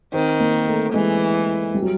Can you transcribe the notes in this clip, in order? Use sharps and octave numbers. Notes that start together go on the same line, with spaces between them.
D#3 C4
A#3
A3
E3 G#3
G3
F#3